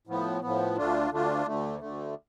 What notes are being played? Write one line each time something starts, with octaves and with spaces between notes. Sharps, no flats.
A2 F3 B3
A2 F3 B3
D2 D3 A3 D4 F4
D2 D3 A3 D4 F4
D2 D3 A3
D2 D3 A3